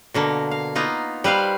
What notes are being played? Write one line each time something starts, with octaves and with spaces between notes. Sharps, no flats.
B2 D3 A#3
F5
A#3 B3 D#4 F4
G3 B4 C5 F5